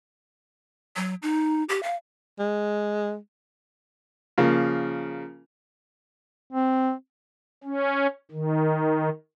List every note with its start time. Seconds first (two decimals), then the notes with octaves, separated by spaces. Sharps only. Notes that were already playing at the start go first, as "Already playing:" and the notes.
0.96 F#3
1.22 D#4
1.69 G4
1.83 F5
2.39 G#3
4.38 C#3 F3 A#3
6.51 C4
7.64 C#4
8.31 D#3